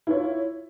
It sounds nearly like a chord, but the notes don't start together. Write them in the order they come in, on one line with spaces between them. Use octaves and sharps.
E4 C#5 F4